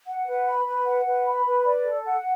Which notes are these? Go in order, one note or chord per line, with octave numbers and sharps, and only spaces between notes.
F#5
B4
B5
B4
F#5
B4
B5
B4
D5
A4
F#5